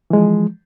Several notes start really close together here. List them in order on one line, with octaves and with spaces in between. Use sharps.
E3 G#3 F3